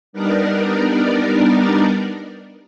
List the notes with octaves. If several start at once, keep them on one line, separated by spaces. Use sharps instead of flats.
G3 B3 D4 D#4 A#4 D5